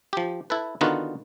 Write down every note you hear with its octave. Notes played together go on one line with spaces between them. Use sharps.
F3 G4
E4 A4 B4
D3 D#3 B3 D#4 F4 F#4